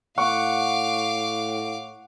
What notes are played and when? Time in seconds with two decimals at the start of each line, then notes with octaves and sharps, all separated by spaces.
0.18 A2 F5 F#5 C#6 D6